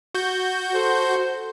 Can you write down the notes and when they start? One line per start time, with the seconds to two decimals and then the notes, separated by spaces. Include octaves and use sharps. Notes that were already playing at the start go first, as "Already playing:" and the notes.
0.15 F#4 G6
0.75 A4 C5